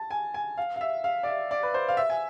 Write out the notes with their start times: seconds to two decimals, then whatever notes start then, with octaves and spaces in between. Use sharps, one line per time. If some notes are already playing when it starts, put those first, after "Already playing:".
Already playing: A5
0.11 G#5
0.34 G#5
0.58 F5
0.76 F5
0.81 E5
1.04 F5
1.23 D5
1.27 E5
1.51 D5
1.63 B4
1.74 C5
1.88 F5
1.97 E5
2.10 G#5